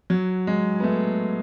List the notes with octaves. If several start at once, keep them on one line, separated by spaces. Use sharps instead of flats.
F#3
G#3
B3
A3